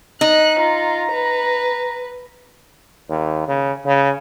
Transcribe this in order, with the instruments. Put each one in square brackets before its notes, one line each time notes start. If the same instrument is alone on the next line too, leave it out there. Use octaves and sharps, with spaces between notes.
[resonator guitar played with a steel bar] D#4 [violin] F#6
[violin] F4 [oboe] A#5
[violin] B4
[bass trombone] D#2
C#3
C#3